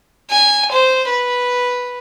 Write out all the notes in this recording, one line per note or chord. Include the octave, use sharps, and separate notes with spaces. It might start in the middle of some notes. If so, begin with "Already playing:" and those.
G#5
C5
B4